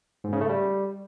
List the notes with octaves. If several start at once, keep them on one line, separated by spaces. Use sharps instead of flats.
G#2
C#3
A3
G3